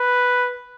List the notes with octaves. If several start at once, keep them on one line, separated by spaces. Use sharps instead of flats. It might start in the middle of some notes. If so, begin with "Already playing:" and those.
Already playing: B4